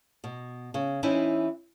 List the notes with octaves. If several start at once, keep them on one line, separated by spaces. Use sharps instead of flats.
B2
C#3
E3 C4 C#4 D#4 E4